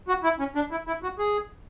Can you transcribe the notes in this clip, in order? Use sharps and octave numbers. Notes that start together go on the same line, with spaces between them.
F#4
E4
C#4
D4
E4
E4
F#4
G#4